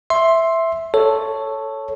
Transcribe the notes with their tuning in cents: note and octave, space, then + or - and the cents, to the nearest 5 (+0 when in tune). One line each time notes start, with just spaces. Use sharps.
E5 +0 C6 +10
A4 +0 C#5 +0